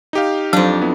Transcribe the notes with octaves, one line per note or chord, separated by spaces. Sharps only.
D#4 G4 F5
F2 F#3 D4
B3 E4